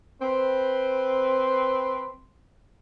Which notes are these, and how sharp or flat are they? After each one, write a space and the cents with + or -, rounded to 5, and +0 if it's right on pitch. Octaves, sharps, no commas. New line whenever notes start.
C4 +0 B4 +0 C6 +0